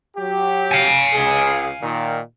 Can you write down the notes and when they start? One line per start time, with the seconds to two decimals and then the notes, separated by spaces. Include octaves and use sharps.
0.17 F#3 G4
0.71 F5 G#5
1.14 C#2 G#4
1.81 A#2 D#3